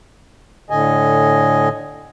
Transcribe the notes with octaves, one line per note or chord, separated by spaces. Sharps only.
A2 D3 D#5 G#5